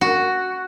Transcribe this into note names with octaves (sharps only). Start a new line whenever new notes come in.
F#4